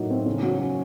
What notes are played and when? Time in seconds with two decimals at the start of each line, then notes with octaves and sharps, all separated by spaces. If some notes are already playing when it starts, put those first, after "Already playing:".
Already playing: A2 F#3 A#3 D#4
0.10 C4
0.26 C#3
0.43 F#3
0.60 C#4